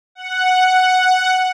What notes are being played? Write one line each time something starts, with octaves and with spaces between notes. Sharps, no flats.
F#5